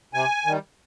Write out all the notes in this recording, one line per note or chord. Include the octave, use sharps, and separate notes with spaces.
C3 G#5
D#3 G3